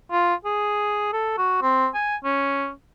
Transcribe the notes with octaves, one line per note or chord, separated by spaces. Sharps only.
F4
G#4
A4
F#4
C4
G#5
C#4